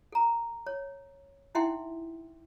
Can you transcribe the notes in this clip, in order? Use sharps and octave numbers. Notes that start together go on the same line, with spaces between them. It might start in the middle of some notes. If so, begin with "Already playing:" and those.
A4 A#5
C#5
D#4 E4 E5 F#5 G5 C6